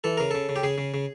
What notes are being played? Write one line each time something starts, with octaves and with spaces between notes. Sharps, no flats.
E3 A4
C#3 A#4
C#3 A4
C#3
G4
C#3 G#4
C#3
C#3